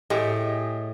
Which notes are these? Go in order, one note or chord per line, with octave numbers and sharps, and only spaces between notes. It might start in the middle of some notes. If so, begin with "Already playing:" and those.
A2 G4 G#4 D#5